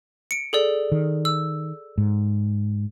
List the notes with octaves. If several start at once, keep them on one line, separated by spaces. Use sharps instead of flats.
C#7 D7
G#4 A4 D5
D#3
E6
G#2